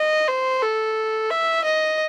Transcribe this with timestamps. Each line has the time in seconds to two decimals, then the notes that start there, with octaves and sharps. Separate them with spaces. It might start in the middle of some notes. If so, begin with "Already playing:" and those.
Already playing: D#5
0.28 C5
0.62 A4
1.30 E5
1.64 D#5